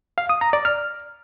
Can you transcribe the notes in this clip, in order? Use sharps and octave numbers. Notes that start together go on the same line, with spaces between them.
F5
D#6
A#5
D5
F6